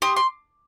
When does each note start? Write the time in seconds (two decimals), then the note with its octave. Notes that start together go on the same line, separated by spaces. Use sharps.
0.02 G4 C6 D#6
0.16 C6